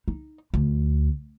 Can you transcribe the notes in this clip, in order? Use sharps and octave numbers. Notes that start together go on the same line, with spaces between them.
D#4
D2